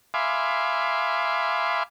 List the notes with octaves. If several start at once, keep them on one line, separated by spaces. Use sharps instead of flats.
E5 F5 G#5 B5 C6 D6